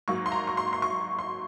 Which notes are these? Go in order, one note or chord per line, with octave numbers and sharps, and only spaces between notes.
G#2 F#3 A#3 C#6
C6
A#5
C#6
C6
C6
C#6
C6